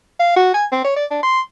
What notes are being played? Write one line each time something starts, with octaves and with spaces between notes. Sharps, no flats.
F5
F#4
G#5
C4
C#5
D5
D4
C6